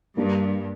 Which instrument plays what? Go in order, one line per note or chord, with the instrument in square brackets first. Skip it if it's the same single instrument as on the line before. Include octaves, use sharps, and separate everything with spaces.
[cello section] G2 [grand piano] G3 A#3 D4